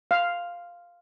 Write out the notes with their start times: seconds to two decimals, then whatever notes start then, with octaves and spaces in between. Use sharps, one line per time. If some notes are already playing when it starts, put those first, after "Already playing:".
0.11 F5